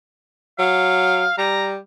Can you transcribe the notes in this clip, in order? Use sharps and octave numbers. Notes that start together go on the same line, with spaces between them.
F#3 F5
G3 A#5